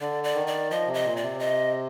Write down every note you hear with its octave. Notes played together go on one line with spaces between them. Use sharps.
D3 D5
D5
D#3
D5
F3 D#5
C3
D#5
A#2
D5
C3
D#5